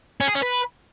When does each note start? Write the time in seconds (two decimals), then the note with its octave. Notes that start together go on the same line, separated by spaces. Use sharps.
0.21 C#4
0.28 G#4
0.35 C#4
0.42 B4